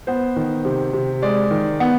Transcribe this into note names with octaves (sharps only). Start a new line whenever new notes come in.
B3 C5
D#3
C3
C3
G#3 D5
D#3
B3